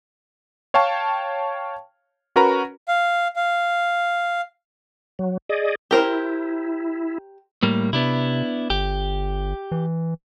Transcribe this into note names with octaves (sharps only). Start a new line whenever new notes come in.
C#5 F5 G5 A5 C#6
C#4 F#4 A#4 B4 A#5
F5
F5
F#3
G#4 D5 D#5
E4 G4 A#4 C5
A2 G3 A#3
C3 B3 D4 E4
G1 G4
E3